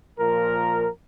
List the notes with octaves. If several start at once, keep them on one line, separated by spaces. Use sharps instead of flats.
A#2 F3 A#4